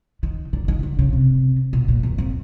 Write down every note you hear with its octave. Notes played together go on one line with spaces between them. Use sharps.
D#3
D3
D#3
D3
C#3
C3
B2
A#2
E2
F2